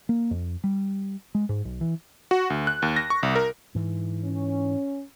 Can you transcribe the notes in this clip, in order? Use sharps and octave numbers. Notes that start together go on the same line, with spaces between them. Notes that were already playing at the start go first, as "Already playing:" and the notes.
A#3
F2
G3
G#3
G#2
B1
E3
F#4
D2
F#6
D#2
A#6
C#6
C2
A#4
G#2 E3
C#4